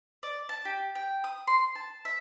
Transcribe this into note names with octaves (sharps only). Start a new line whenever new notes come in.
D5
A5
G4
G5
D#6
C6
A5
E5